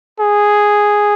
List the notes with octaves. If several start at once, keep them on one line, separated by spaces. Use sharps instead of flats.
G#4